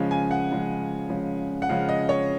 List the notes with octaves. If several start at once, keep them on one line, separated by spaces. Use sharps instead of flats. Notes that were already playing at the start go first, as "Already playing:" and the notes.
Already playing: C#3 F3 G#3 C#4
G#5
F#5
C#3 F3 G#3 C#4
C#3 F3 G#3 C#4
F#5
C#3 F3 G#3 C#4 F5
D#5
C#5